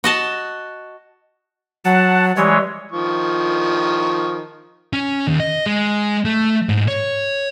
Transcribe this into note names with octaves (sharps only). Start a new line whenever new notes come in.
F#4 D#5 A5
F#3 F#5 A5
E3 G3 G#3 C#5
D#3 F3 C#6
C#4
D#2
D#5
G#3
A3
G#2
C#5